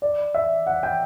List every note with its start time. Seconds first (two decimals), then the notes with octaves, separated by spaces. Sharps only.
0.02 D5
0.35 E5
0.67 F#5
0.83 G5